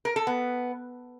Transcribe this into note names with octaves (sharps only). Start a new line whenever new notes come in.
A#4
A4
B3